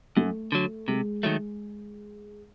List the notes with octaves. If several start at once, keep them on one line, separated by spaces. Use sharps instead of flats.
F#2 A3
D3 F#3
C3 G#3
D#3 F#3 A3